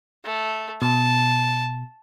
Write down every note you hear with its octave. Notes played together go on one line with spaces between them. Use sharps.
A3
B2 A5